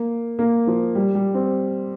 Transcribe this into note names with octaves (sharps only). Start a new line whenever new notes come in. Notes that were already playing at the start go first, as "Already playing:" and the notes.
Already playing: A#3
A#3
F3
G3
G3
C4